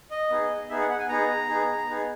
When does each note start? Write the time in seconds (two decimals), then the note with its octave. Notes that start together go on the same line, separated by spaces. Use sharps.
0.11 D#5
0.30 B3 D#4 G#4
0.69 B3 D#4 G#4 E5
0.80 F#5
0.90 F#5
0.99 G#5
1.09 B3 D#4 G#4 A#5
1.49 B3 D#4 G#4
1.88 B3 D#4 G#4